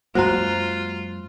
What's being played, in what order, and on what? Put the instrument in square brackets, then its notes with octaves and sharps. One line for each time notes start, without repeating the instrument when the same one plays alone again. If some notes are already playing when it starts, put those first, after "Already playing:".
[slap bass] F#2 G#3 A#3 [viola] F4 [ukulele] F#4 [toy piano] C5 A#5